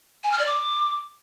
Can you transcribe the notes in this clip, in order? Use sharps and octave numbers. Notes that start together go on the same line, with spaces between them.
G#5
F6
D5
D6